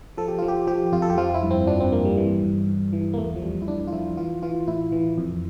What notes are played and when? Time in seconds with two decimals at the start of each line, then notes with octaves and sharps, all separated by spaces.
0.18 F3 A4
0.28 G4
0.38 F3 F4
0.48 G4
0.67 F3 G4
0.92 F2 F4
1.02 A4
1.10 G4
1.18 F3 F4
1.34 E4
1.43 G2
1.51 C4
1.67 F3 D4
1.80 C4
1.92 G2 A#3
2.05 G3
2.17 E3 G3
2.43 G2
2.67 G2
2.93 E3
3.13 A#3
3.18 E2 A3
3.36 F3
3.42 E2 G3
3.62 E4
3.68 E2 D4
3.87 F4
3.92 F3 E4
4.17 E3 F4
4.42 E3 F4
4.67 A2 E4
4.92 E3
5.18 F2